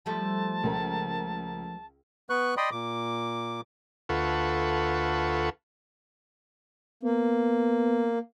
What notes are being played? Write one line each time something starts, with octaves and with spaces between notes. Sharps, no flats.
F3 G3 A3 A5
C#2 A#4
B3 B4 C#6 F#6
D5 D#5 G5 B5 C6 D#6
A#2 D6
D2 F4 A4 B4 F#5 C#6
A#3 B3